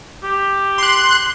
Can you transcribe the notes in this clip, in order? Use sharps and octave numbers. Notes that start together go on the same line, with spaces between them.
G4
C6 F#6